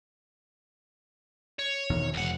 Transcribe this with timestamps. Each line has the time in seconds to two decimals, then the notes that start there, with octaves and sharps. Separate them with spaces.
1.59 C#5
1.90 E2 B2 D#3
2.13 F1 C#2 F#5